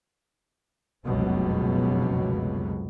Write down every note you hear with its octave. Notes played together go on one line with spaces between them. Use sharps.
F1 C#2 F#2 B2 F#3